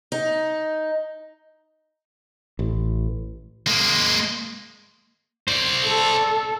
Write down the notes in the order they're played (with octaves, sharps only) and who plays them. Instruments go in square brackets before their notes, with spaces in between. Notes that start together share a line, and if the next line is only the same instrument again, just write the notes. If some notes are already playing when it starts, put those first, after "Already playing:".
[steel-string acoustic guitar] D#4
[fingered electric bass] A1
[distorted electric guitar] G#3 A#3
C5 D5
[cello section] A4